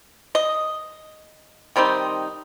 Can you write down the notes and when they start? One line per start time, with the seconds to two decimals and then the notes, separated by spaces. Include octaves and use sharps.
0.35 D#5
1.76 D#3 G3 C4 D#4